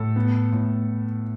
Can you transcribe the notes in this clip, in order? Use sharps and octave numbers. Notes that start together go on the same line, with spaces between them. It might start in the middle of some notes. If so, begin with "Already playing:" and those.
Already playing: A2 A4
B3
A2